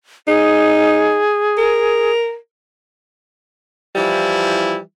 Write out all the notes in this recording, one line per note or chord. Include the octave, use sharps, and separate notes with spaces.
D#4 G#4
A#4
E3 F3 G3 E4